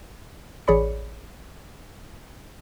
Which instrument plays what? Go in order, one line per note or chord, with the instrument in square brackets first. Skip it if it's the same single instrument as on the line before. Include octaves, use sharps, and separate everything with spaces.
[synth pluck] A1 G#4 C#5 D5 B5 C#7